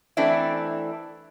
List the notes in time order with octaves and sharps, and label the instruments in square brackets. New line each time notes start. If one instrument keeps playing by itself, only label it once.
[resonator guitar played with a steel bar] E3 A3 C4 D4 E4